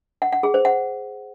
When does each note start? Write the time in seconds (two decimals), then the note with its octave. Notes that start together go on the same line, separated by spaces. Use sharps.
0.22 F#5
0.33 F#5
0.43 G#4
0.54 C5
0.65 F#5